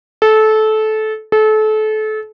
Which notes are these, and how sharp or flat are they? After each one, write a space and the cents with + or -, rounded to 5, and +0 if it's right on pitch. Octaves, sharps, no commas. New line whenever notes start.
A4 -20
A4 -30